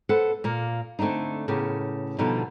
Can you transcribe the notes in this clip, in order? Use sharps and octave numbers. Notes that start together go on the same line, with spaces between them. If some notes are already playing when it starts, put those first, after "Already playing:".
A4 B4 C5 F#5
A#2 A#3
D3 A3 C4 D4 D#4
A2 C#3 B3 G4 A#4
B2 D3 F3 G3 D#4